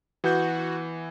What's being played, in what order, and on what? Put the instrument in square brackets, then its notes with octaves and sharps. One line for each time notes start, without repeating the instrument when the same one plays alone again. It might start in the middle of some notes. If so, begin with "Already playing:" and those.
[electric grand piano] E3 G6 [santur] B3 [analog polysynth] F#4